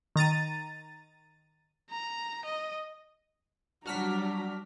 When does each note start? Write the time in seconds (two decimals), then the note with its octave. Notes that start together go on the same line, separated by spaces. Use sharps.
0.16 D#3 A#5 A6 D#7
1.91 A#5
2.45 D#5
3.86 F#3 G3 D4 F#4 A#5 F6 B6